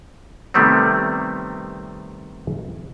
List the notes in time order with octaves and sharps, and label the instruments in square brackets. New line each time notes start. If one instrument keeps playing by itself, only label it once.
[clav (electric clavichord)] C3 D#3 G3 A3 B3 C4